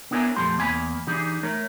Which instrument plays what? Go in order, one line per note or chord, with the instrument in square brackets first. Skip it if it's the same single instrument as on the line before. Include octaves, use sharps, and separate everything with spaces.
[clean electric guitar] B3 D4 E4 A#4 C#5 G#5
F2 A#2 A3 G4 C6
E2 A#3 G#5 B5
E3 D4 D#4 G4 G#4
A3 A#4 C#5